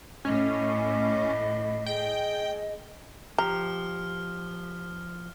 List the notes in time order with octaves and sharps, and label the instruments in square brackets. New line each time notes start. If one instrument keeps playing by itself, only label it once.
[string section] A2 [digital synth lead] C#4 [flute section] D#5 B5 D6
[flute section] G#4 D#5 [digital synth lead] G5
[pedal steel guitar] F3 [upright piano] G4 [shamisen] A#5 [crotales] F6